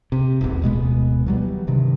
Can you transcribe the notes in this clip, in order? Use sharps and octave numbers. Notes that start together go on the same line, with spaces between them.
C3
D#1 A1 E2
D1 B2 G#3 B3
E3 F#3 G3
G2 C3 D#3